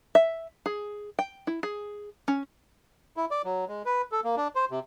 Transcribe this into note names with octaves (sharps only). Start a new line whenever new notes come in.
E5
G#4
G5
E4
G#4
C#4
E4
D5
F#3
G#3
B4
A4
A#3
D4
C5
C3